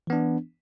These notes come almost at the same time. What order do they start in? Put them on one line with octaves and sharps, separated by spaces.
E3 B3 D4